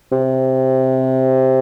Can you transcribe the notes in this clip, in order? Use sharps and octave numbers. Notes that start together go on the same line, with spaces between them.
C3